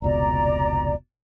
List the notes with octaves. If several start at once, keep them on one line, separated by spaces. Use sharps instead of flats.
F1 C#2 B2 D5 A#5